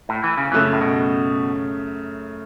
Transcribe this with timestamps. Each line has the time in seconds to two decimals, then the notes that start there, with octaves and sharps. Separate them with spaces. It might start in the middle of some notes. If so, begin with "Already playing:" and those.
0.09 A2
0.24 E3
0.37 C#3
0.52 F#2 C#3 E3 A3
0.73 A2
0.81 B2